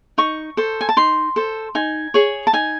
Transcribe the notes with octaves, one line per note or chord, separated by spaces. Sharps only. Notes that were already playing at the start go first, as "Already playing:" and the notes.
D#4 C#6
A4 C5
G#5
A5
D#4 C6
A4 C5
D#4 G#5
G#4 C#5
A5
D#4 G#5